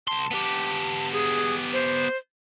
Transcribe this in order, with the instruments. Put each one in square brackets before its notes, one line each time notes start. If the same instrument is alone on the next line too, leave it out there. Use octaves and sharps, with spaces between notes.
[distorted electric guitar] C2 C6 [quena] A5
[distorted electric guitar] B3 G4
[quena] G#4
C5